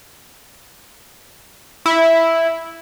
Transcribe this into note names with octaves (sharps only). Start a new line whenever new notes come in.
E4